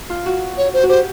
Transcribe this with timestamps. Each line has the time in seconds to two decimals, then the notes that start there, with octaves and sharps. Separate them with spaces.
0.10 F4
0.26 F#4
0.58 C#5
0.73 C5
0.83 F#4
0.89 G4 C5